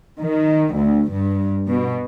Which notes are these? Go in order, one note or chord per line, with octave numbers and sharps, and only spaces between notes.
D#3
D2
G2
B2